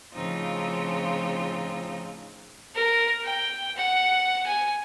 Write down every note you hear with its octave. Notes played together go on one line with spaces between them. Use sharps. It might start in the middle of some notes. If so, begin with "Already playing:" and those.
A2 C#3 F3 C4 D#4 F4
A#4
G5
F#5
G#5